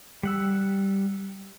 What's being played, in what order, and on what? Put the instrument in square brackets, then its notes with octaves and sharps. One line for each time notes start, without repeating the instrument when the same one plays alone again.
[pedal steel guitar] G3 F#5 E6